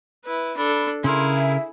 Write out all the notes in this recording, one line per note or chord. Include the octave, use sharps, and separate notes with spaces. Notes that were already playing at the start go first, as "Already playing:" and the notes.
E4 B4
D4 A4 B5
C#3 E4 G#4 A#4 C6
E5